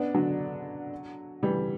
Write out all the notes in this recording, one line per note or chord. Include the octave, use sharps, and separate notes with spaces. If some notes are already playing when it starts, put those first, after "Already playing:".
Already playing: B3 D4
D3 F#3
E3 G3